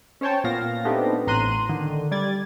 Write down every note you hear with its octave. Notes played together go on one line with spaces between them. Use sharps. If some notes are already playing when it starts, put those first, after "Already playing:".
C#4 C5 C#5 G5 A5
A#2 B3 F5 A#6
A3 B3 C4 D4 D#4 G4
A1 A2 A#5 C6 F#6 D#7
D3 D#3
G3 D5 G#6 A6